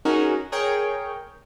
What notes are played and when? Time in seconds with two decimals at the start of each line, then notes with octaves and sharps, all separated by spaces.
0.05 C#4 D#4 F#4 G#4 A#4
0.52 G#4 A#4 C#5 G5